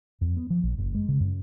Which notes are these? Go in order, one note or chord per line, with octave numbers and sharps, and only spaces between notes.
F2
B3
F3
A#1
F#1
G#3
C#3
F#2